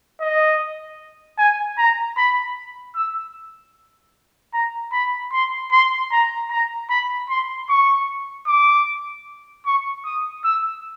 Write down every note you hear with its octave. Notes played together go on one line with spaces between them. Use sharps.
D#5
G#5
A#5
B5
E6
A#5
B5
C6
C6
A#5
A#5
B5
C6
C#6
D6
C#6
D#6
E6